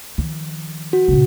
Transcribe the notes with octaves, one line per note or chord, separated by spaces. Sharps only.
D#3 F3
F#4
A#2 C#3